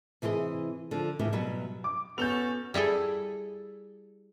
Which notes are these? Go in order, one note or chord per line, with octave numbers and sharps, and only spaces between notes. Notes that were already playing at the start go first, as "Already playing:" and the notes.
C3 E3 G#4 A#4 D#5
D3 F3
A2 C#3 E3 G4 B4 E5
B2 F#3 G3 B4
D6
B3 C#4 F#4 A4 G6 F7
G3 E4 G#4 A4